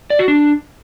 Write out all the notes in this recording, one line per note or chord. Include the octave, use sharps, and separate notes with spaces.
D5
F#4
D4